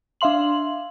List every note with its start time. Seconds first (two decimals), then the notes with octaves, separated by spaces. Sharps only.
0.21 D4 E5 F5 C6 F#7